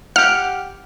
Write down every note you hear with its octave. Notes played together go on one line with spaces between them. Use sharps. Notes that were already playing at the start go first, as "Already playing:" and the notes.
G4 F#5 F6